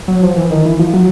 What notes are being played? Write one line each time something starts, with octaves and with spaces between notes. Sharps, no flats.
F#3
F3
E3
D#3
E3
F3
F#3